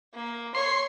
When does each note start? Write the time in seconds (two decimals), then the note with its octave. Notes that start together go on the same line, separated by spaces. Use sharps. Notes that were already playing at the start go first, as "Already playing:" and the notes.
0.14 A#3
0.55 C#5 C6